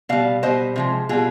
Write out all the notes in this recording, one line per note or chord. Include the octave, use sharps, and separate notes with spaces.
B2 G3 D5 F5
B2 G3 C5 D#5
C3 F3 G#3
B2 G3 F4 G#4